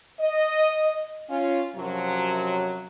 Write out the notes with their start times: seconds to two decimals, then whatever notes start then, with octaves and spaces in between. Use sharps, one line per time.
0.21 D#5
1.30 C#4 F4
1.76 F#2 C3 F3 F#3